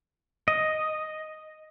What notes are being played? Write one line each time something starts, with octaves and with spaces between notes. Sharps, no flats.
D#5